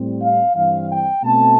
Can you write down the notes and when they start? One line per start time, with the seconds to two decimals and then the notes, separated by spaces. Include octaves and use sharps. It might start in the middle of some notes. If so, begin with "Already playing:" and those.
Already playing: A2 G3 C4
0.22 F5
0.55 G2 E3 G3 C4 F5
0.90 G5
1.23 B2 A3 C4 A5